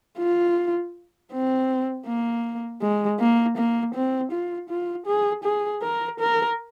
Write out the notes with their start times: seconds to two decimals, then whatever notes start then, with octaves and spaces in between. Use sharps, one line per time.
0.18 F4
1.32 C4
2.06 A#3
2.82 G#3
3.20 A#3
3.57 A#3
3.94 C4
4.32 F4
4.69 F4
5.07 G#4
5.44 G#4
5.83 A#4
6.20 A#4